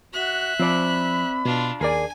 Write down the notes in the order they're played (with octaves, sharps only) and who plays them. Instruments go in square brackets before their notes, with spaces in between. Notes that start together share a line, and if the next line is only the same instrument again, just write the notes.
[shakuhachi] F#4 [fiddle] E5 F#6
[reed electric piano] F3 [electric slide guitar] C4 D5 [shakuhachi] B5
[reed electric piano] B2 [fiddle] D4 F4
[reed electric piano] D#2 A#4 D5 [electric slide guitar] G#4 [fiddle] G#5